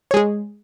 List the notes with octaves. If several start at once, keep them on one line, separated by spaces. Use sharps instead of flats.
G#3 G#4 C#5